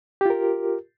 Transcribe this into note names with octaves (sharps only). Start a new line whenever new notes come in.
F4 G4 A#4